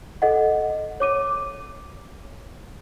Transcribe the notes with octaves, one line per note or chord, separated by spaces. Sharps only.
A4 D#5 F#5
C#5 D6 D#7